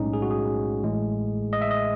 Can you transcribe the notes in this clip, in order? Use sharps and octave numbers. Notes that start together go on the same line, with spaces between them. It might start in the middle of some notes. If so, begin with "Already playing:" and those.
Already playing: B1 A2 G#3 C#4 D#4
G#4
F#4
G#4
A1 A2 G#3
D#5
E5
D#5